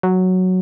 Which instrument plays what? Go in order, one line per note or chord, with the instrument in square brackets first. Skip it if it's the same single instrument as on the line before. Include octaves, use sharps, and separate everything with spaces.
[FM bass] F#3